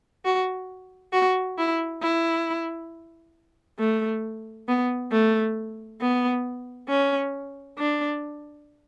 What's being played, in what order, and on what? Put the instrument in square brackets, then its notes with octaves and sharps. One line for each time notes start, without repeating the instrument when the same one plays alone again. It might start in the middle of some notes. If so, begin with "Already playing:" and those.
[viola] F#4
F#4
E4
E4
A3
B3
A3
B3
C#4
D4